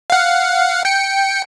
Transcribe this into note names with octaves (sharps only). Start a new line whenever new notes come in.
F5 F#5
G5 C#7